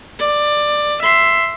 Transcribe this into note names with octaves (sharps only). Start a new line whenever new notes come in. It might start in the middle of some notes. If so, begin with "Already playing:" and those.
D5
E5 C6